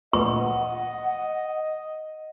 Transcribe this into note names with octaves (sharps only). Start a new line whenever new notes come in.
D2 A#2 E3 D#5 F#5 C#6